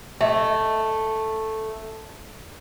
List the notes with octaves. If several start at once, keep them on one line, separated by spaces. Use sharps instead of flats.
A3 D#5 E5